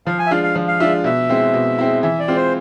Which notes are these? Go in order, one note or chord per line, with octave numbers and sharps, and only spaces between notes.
F3 F5
G#5
E5
G#3 D4 F4 F5
F5
F3
F5
G#3 D4 F4 E5
B2 E5
G#3 C4 E4
B2
G#3 C4 E4
E3 E5
D5
G#3 C4 F4
C5